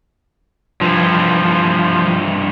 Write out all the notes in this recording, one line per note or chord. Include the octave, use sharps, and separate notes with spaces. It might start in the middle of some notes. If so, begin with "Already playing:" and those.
G2 E3 F3